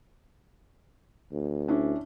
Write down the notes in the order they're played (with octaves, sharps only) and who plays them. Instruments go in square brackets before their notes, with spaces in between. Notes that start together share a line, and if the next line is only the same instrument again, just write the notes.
[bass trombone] D2
[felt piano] C#4 D4 E4